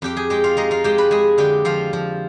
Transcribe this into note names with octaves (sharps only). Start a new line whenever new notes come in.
F2 G4 G5
G#4 G#5
G#3 G4 G5
F4 F5
G#3 D#4 D#5
F4 F5
G#3 G4 G5
B4 B5
G#3 G#4 G#5
D3 G4 G5
F3 F4 F5
F3